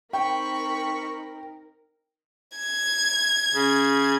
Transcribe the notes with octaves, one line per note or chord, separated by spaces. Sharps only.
C4 D#4 A#4 G5 B5 C#6
G#6
C#3